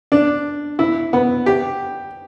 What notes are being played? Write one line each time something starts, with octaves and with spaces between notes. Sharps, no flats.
D4
E4
B3
G4